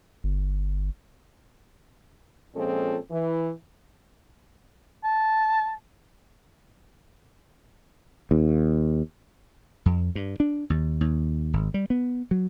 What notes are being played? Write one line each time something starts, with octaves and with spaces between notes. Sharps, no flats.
G1
A#2 F3 G#3 C4 C#4 A4
E3
A5
D#2
F2
G2
D4
D#2
D#2
G#1
G3
B3
F#3